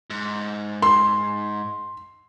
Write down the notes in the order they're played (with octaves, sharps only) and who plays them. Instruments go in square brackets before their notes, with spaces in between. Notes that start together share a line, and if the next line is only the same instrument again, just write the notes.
[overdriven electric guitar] G#2
[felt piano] C6